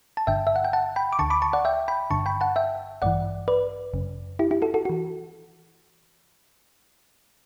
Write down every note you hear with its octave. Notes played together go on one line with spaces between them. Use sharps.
A5
G1 G2 D3 E5 G5
E5
F#5
G5
F#5 A5
G5 B5
D6
D2 D3 A5 C#6
B5 D6
A5 C#6
D5 F#5
E5 G5
G5 B5
G1 G2 D3 A5 C#6
G5 B5
F#5 A5
E5 G5
A1 G2 E3 D5 F#5
B4 D5
G1 F#2 C#3
E4 G4
E4 G4
F#4 A4
F#4 A4
E3 F#4